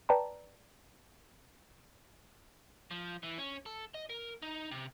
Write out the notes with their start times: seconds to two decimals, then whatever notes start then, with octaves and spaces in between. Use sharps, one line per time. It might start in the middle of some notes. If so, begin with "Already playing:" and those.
0.09 B4 D5 G5 A5 A#5
2.91 F3
3.23 E3
3.38 C#4
3.66 A4
3.94 D#5
4.10 A#4
4.42 D#4
4.71 C3